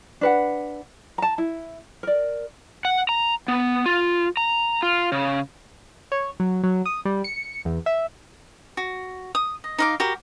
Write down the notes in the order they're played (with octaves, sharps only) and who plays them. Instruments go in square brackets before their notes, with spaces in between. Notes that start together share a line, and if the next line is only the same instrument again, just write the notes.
[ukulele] D4 B4 F#5
A5 A#5
E4
A#4 D5
[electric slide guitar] F#5
A#5
B3
F4
A#5
F4
C#3
[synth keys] C#5
F#3
F#3
D#6
G3
C#7
E2
E5
[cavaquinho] F#4
D#6
D#5
D#4 F5 D6
F#4 G4 A#4 B5